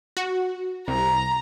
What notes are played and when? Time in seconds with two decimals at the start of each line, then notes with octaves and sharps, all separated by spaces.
0.17 F#4
0.88 C2 A#5